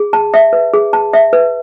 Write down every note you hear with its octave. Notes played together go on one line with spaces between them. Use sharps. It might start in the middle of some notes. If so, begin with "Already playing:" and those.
Already playing: G#4
A5
E5
B4
G#4
A5
E5
B4